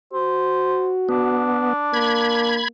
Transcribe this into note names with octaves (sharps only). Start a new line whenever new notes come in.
F#4 C5
B3 D4
A#3 B5 G#6